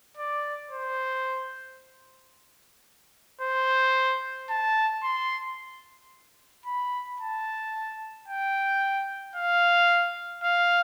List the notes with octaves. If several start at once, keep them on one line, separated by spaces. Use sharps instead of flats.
D5
C5
C5
A5
C6
B5
A5
G5
F5
F5